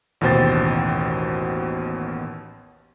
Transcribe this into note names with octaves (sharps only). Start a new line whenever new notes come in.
A1 D#2 B2 C5 G5 A6